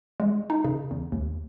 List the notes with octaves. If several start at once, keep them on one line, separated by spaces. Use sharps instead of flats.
G#3
D#4
C#3
E2
D#2